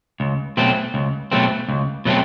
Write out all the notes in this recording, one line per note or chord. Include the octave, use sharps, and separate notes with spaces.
C#2
B2 F#3 A3 C4
C#2
B2 F#3 A3 C4
C#2
B2 F#3 A3 C4